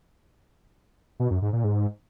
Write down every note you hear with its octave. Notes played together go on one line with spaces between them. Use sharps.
B2
F#2
G#2
A#2
G#2